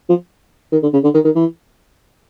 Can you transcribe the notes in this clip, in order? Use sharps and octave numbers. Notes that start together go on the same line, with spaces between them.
F3
D#3
D3
C#3
D3
D#3
D#3
E3